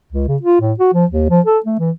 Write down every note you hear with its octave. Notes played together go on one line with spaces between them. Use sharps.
C#2
C#3
F4
A2
F#4
F3
D#2
F3
A4
A3
E3